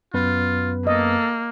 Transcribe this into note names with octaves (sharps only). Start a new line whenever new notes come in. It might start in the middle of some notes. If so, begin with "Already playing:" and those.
F#2 B3 F4 B4
A#3 A4 D#5